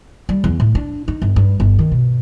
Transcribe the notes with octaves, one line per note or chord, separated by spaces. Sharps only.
G3
E2
A2
D4
D#4
G1
G2
G1
D#3
B2